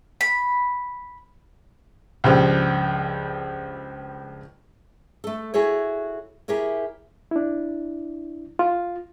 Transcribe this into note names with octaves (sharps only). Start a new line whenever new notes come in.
B5
C#2 G2 F3
A3 A4
E4 F#4 G#4 A4 C#5
E4 G4 G#4 A#4 C#5
D4 E4
F4